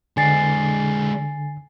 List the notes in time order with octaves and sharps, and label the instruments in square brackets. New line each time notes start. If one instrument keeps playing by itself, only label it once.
[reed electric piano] D3 [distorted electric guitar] G#3 D4 [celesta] G#5 A6 C7